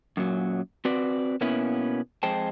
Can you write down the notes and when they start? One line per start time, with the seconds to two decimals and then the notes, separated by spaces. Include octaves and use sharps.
0.17 F#2 A#2 F#3
0.85 C4 F#4 B4 D5
1.41 B2 A#3 B3 C#4 E4 B4
2.23 F2 G#3 C5 G5 A5